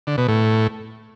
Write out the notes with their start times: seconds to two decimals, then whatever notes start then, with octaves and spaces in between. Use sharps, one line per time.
0.07 D3
0.18 B2
0.28 A2